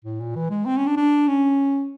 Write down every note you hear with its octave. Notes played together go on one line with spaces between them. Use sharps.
A2
A#2
E3
G#3
C4
C#4
D4
D4
C#4